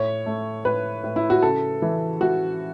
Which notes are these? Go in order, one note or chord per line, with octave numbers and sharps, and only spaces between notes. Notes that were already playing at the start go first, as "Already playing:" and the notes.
Already playing: A2 C#5
A3
A2 B4
A2
E4
F#4
C#3 A4
E3
E3 F#4